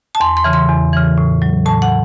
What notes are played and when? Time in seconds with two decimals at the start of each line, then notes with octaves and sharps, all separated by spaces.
0.15 A5
0.20 E2 C6
0.37 C6
0.44 C#3 E3
0.53 C6
0.69 E2
0.93 C#3 E3
1.18 A2
1.42 F#3
1.66 A2 A5
1.82 F#5